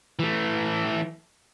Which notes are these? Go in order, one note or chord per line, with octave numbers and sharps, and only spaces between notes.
E3 A3